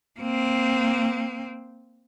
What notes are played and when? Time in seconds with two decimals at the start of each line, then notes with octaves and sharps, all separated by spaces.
0.20 A#3 C4